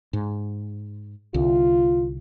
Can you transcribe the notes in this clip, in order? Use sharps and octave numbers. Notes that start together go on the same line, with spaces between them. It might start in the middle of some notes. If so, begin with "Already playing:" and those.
G#2
C2 D3 F4